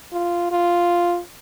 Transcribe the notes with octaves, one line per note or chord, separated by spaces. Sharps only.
F4
F4